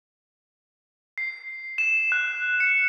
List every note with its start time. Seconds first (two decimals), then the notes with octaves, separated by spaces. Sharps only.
1.18 C7
1.78 E7
2.12 F#6
2.60 C#7